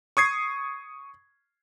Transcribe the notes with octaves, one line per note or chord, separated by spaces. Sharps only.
C#6 D#6 G#6 C7